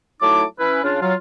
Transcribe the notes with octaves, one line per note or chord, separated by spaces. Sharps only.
F#3 A3 D#4 E4 A5 D6
E3 C#4 E4 B4
C#3 D4 F4
F#3 F4